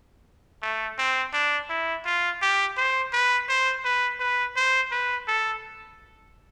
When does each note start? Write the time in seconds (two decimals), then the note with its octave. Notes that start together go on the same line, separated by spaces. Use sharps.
0.62 A3
0.98 C4
1.33 D4
1.70 E4
2.05 F4
2.42 G4
2.77 C5
3.13 B4
3.49 C5
3.85 B4
4.20 B4
4.56 C5
4.91 B4
5.28 A4